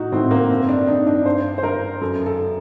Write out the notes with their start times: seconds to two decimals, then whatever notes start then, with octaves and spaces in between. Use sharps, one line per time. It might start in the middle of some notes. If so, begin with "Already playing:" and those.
Already playing: A2 D#4 F#4
0.12 A2 C4
0.31 A#3
0.50 G2 C4
0.69 D4
0.87 G2 D#4
1.06 D4
1.25 G2 C5
1.58 C5
1.63 G2 A#4
2.01 F#2 A4
2.26 A4